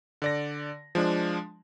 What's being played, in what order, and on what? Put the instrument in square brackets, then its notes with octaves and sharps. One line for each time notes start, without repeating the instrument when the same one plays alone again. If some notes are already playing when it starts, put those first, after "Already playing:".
[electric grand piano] D3 D5 A#6
F3 G#3 D4